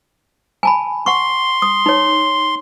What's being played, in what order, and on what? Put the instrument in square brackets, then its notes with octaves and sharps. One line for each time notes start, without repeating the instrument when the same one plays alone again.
[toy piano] G#5 A5 B5
[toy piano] F#5 C#6 [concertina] C6
[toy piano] D#6
D#4 C#5